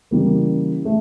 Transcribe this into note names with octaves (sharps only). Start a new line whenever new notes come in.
C#3 E3 G3 A#3
A3